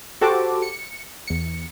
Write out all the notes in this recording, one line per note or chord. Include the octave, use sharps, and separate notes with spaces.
F#4 G4 A4 C5 A5 D6
C#7
E2 C#7